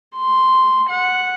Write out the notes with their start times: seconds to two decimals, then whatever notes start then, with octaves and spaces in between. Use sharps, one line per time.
0.17 C6
0.90 F#5